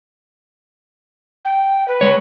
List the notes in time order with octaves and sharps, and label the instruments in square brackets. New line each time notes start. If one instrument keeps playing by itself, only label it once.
[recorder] G5
B4
[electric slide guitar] G#3 C#5